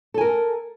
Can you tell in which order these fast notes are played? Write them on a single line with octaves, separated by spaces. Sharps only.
A4 G#5 A#4